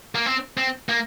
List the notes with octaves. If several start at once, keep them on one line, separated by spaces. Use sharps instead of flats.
A#3
C4
C4
A#3